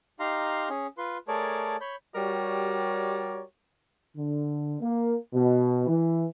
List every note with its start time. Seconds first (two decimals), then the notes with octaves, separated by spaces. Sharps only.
0.20 D#4 G4 F5 A#5 C6
0.70 C#4 G#4
0.98 F4 B4 C6
1.28 A3 G#4 A#4 C#5 D5 A5
1.81 C#5 B5 G6
2.15 G3 F#4 G4 A#4 C#5 D5
4.16 D3
4.80 A#3
5.34 B2
5.87 E3